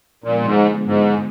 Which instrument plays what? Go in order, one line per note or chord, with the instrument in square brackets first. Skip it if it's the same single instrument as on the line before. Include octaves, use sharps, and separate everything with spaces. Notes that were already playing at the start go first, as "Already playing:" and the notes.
[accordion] A#2 [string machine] D3 F3 G#3 B3
[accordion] G#2
G#2